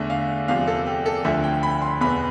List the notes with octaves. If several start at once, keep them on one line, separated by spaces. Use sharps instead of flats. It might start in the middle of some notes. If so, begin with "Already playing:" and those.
Already playing: E2 D3 A3 E5
F5
E2 C3 F3 F5
A4
G4
A4
D2 D3 F3 E5
G5
B5
C6
E2 B2 B3 B5